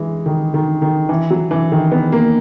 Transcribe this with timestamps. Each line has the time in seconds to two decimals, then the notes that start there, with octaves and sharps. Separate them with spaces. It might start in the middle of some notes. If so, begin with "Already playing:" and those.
Already playing: E3 G#3
0.26 D#3
0.54 D#3
0.82 D#3
1.09 E3
1.30 F#3
1.51 E3
1.72 D#3
1.92 B3
2.12 A#3